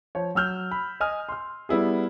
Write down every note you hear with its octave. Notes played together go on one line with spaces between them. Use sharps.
F3 C#5
F#3 E6 F6 G6
B5
D#5 G#5 D#6 F6
C6 F6
G3 B3 E4 G#4